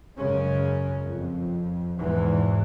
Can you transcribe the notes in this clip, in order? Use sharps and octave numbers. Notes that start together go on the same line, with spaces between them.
F#2 C#3 G#3 C#4
F2
E2 G#2 B2 E3